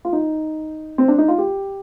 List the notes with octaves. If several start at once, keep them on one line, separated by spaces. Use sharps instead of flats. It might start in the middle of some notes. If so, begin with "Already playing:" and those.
F4
D#4
C4
D4
D#4
F4
G4